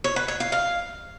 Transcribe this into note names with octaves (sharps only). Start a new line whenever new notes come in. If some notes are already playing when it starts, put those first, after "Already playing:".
C#5
B4
C#5
F5
F5